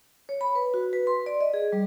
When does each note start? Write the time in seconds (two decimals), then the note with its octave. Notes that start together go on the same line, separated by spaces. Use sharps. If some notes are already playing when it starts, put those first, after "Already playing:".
0.29 C#5
0.41 B5
0.55 B4
0.74 F#4
0.93 B4
1.07 C6
1.26 D5
1.41 D#5
1.54 G#4
1.72 G3